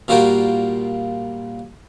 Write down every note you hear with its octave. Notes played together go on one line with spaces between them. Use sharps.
A#2 G3 F4 F#4 A#4 G5